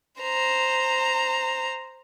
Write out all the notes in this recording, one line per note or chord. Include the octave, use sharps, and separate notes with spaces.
C5 A#5